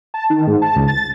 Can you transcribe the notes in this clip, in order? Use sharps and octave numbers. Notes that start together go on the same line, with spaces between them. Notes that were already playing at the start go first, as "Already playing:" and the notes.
A5
D#3
G#2
A5
C#2
A6